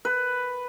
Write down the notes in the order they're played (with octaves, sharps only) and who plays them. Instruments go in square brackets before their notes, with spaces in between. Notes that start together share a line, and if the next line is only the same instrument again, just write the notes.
[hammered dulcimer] B4